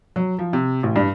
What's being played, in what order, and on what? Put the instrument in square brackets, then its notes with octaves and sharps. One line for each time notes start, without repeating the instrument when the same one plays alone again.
[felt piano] F#3
F3
C3
A1
G2